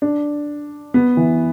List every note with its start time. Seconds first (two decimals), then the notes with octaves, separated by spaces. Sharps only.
0.02 D4
0.94 B3
1.17 E3